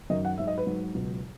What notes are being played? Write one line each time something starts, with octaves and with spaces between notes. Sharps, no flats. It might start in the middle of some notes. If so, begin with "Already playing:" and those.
F#2 D#3 F#3 D#5
F#5
G#2 F#3 E5
D#5
B4
G#2 F#3
C#2 B2 F#3